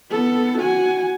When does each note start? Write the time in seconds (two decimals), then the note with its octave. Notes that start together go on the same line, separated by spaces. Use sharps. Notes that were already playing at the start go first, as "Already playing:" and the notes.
0.11 B3 A4
0.59 F#4 G#5